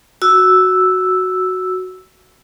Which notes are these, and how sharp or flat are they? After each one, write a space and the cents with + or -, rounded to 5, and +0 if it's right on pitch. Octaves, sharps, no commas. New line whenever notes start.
F#4 +0 E6 +0